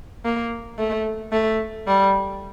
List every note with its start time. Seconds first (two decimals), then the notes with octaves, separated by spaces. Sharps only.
0.25 A#3
0.78 A3
1.32 A3
1.87 G3